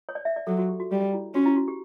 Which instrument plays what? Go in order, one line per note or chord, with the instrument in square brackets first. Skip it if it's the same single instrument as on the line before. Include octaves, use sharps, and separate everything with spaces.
[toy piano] C#5
D5
E5
D5
[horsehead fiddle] F#3 [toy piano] A4
[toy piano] F#4
G4
F#4
[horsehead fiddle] G3 [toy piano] G4
[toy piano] E4
[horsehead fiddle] C#4 [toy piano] F#4
[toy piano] E4
F#4
G4